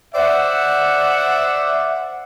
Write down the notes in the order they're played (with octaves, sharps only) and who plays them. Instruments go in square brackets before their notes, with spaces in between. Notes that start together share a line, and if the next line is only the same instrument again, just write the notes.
[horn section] C5 D5 E5 F#5